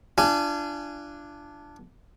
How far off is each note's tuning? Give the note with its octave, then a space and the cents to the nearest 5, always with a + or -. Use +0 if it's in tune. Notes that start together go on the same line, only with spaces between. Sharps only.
D4 +0 F4 -35 G#5 +0